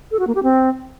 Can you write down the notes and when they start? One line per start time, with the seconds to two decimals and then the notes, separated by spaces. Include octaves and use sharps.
0.11 A4
0.19 F#4
0.27 A#3
0.35 G4
0.43 C4